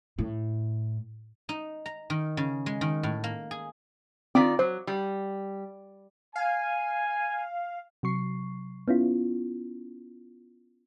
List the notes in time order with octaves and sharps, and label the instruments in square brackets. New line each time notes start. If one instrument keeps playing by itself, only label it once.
[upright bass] A2
[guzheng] D#4
A#5
D#3
C#3
G#3
D#3
A2
A#3
G#4
[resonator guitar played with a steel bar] D#3 F4 D5 [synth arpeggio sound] C4 B6
[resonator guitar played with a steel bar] F#3 [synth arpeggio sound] C5
[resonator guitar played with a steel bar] G3
[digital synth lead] F5 [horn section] G#5
[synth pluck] C3 F#3 C#6 C7
B3 C#4 E4 F4